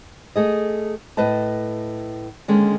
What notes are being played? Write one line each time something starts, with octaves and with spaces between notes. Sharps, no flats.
A3 G#4 D#5
A2 B4 D#5 A5
D3 D#3 G#3 A#3 C#4 D4